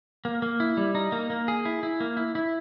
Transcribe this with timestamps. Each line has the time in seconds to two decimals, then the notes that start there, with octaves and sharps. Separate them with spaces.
0.25 A#3
0.42 A#3
0.60 E4
0.77 G3
0.95 D#4
1.12 A#3
1.30 A#3
1.48 G#4
1.65 E4
1.83 E4
2.00 A#3
2.17 E4
2.35 E4